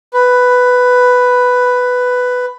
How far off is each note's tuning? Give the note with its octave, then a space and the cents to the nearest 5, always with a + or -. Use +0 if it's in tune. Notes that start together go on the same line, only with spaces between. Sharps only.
B4 +5